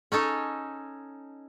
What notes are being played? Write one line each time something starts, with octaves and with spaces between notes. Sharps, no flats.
C#4 D#4 A4 C#5